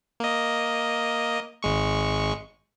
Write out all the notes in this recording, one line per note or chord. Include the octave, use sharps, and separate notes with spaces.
A#3 D#5
G#1 G#3 C#6